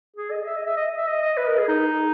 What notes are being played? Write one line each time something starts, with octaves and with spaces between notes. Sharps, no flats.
G#4
D#5
E5
D#5
E5
D#5
E5
D#5
D#5
B4
A#4
G#4
D#4